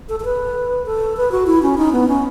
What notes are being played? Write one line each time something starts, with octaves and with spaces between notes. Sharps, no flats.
A4
A4
B4
A4
B4
F#4
E4
C#4
D#4
B3
C#4